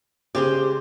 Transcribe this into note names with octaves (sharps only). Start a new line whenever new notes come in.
C#3 G#3 G4 C5